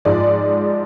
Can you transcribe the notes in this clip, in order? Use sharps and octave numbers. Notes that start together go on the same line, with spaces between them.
G#2 F3 G#3 D5